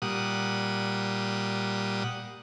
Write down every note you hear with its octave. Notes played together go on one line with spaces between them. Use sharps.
A#2 G3 F#5 D#6